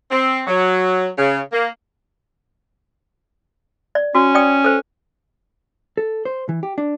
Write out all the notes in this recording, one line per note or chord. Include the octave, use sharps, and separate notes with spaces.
C4
F#3
C#3
A#3
D5
C#4 F#4
D5 G5 D#6
A4 C5
A4
C5
E3
G4
D4